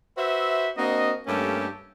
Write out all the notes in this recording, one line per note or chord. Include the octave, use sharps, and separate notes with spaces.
F#4 B4 C5 E5
A#3 C4 D4 F#4 D#5
G2 A3 A#3 C#4 G4 A4